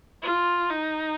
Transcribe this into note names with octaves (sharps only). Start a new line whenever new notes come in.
F4
D#4